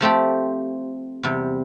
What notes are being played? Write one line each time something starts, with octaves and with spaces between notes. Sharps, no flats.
F3 A3 C4 G4
E2 C3 G3